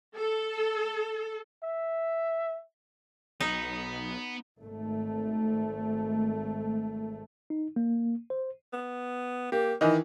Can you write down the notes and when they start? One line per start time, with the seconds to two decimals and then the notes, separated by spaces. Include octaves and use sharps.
0.16 A4
1.64 E5
3.40 B1 B3 D#4
4.62 G#1 A3
7.50 D#4
7.76 A#3
8.30 C5
8.73 B3
9.52 A#3 G4
9.81 D#3 E3 D#5